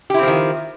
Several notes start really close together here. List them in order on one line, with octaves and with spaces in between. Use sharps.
G4 E4 C4 F3 D#3